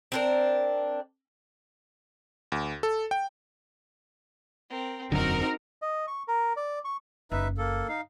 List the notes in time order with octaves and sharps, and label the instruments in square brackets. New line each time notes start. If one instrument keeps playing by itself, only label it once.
[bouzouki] C4 D4 A#4
[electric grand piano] D2
A4
G5
[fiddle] C4 A#4
[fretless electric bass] E1 F#2 D3 [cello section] C4 D#4 A#4 [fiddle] F#4 A#5
[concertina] D#5
C#6
A#4
D5
C#6
[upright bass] F#1 [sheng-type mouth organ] D#4 B4 E5
[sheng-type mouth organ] A#3 A4
D#4 F5